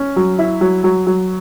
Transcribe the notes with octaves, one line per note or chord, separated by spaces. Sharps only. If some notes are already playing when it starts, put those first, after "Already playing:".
Already playing: C#4
F#3
E4
F#3
F#3
F#3